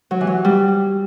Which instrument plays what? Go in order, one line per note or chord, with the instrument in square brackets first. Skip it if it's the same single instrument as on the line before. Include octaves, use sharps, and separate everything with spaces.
[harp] F#3
E3
F#3
G3